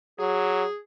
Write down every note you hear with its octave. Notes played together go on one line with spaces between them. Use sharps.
F#3 G#4